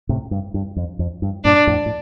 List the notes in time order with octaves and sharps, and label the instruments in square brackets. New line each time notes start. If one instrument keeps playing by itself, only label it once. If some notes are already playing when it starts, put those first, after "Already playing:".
[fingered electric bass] A2 C3
G2
G2
F2
F2
G2
[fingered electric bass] G2 A#2 [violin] D4
[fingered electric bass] F2 A2
A2